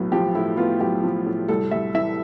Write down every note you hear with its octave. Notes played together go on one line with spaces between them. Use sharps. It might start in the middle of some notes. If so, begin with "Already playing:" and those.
Already playing: B1 A2 B3
F3 G4
A2 E4
B3 F4
B1 G4
F3
A2
C2 A4
C2 E5
E3 E5